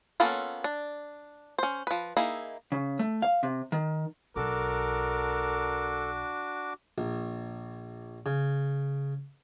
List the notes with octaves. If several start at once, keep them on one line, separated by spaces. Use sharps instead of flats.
A#3 B3 C#4 F4 A4
D4
C#4 C5
F3 B4
A#3 D#4 E4 G#4
C#3
A3
F5
C3
D#3
B1 D4 F#4 A4 A#4 D6
A#1
C#3